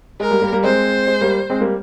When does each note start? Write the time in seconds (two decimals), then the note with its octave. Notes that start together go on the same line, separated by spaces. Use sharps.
0.20 G#3 A#4
0.31 G3 A#3
0.42 G3 A#3
0.52 G3 A#3
0.63 G#3 C4 C5
1.07 G#3
1.21 G3 A#3
1.50 G#3 C4
1.61 G3 A#3